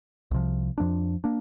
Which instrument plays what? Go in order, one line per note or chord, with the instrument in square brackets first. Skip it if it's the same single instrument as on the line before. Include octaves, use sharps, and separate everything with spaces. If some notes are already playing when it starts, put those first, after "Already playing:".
[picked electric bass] C2 C3 F3
F2 F3 A#3 D4
A#3 D4